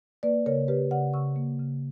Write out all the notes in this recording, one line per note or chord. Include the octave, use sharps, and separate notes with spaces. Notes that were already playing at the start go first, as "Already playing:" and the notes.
A#3 B4 D5
C#3 A#4 C#5
C#3 G4 B4
C#3 D5 F#5
C#3 C#6 E6
A#3
C#3